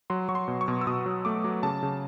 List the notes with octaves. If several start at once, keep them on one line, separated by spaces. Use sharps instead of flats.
F#3 C6
F#3 C#6
C6
B2
C#6
B2
E6
B2 D#6
F#3
A3 D6
F#3
C#3 A5
C#3